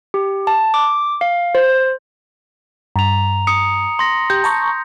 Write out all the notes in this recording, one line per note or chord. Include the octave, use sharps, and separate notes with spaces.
G4
A5
D6
F5
C5
G2 A#5 F7
D#6 C#7
C6 A#6
G4 G6
A5 A#5 C#6